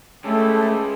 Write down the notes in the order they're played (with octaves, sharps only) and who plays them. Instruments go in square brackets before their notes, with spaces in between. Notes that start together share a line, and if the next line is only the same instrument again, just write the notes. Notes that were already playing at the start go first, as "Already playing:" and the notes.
[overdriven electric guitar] G#3 C#4 [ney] A3 [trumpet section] E4 G4 A4